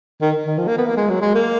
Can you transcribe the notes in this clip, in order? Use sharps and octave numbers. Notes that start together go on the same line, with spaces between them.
D#3
D#3
F3
A#3
B3
A#3
G#3
F#3
G#3
A#3